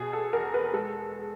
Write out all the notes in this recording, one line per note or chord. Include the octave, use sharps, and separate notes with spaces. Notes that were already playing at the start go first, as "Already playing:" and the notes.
Already playing: B2 G#4
A4
E2 A#4
B4
G#3 A4